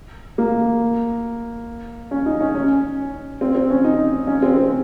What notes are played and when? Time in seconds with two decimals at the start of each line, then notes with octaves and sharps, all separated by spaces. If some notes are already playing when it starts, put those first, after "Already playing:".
0.38 A#3
2.11 C#4
2.26 D#4
2.41 C#4
2.55 C#4
3.41 C4
3.55 C4
3.70 C#4
3.84 D#4
4.27 C#4
4.42 C4
4.56 C4